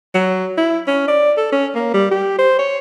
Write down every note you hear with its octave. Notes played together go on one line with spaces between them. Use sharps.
F#3
E4
C#4
D5
A4
C#4
A#3
G3
G4
C5
C#5